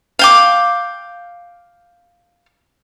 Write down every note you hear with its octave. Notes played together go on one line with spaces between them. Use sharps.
F5 G5 D6